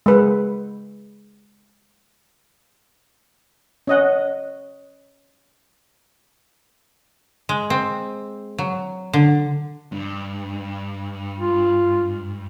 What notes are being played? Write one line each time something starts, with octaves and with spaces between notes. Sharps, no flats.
G#3 B4
C#4 D#5 F#5
G#3
C4
F#3
D3
G2
F4